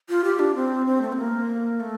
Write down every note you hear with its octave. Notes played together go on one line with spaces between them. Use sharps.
F4
G4
D4
C4
C4
A3
C4
A#3
A3